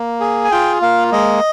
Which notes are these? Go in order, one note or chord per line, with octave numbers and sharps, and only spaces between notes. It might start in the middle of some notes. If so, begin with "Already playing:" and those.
Already playing: A#3
G#4
G#5
F4 G5
A#3 F5
G#3 D#5